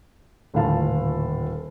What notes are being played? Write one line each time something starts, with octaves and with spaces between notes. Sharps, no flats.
D#1 A2 D3 F4 F5 A5